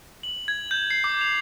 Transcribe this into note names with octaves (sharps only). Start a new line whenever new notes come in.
F#7
G#6
G6
C7
D6
F7